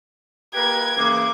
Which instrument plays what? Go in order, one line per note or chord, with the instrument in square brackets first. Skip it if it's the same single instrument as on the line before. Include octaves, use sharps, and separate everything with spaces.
[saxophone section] A#3 G4 B4 [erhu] G#6
[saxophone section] C#3 E3 A#3 [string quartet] D6